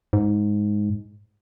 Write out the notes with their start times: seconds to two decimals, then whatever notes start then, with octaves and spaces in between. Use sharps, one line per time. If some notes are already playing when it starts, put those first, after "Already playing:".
0.13 G#2